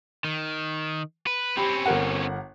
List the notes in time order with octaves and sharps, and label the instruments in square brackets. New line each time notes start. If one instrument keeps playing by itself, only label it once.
[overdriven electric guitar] D#3
B4
[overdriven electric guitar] C4 C#4 [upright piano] G4 B5
[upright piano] G1 A#4 F#5